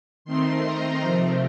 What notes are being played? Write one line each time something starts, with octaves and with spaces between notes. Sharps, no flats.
D#3 A3 C4 D#4 C6
A#5
C3 F3 A3 C4